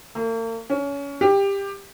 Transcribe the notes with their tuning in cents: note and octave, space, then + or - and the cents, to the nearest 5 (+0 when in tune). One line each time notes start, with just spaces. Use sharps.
A#3 -45
C#4 +25
G4 +15